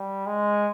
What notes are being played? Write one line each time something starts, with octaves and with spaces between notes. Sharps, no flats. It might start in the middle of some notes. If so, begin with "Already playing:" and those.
Already playing: G3
G#3